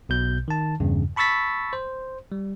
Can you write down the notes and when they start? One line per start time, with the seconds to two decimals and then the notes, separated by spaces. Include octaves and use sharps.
0.09 B1 B2 G6
0.48 D#3 A5
0.80 E2 G2 C#3
1.16 A5 B5 C#6 E6 A6 B6
1.73 C5
2.32 G3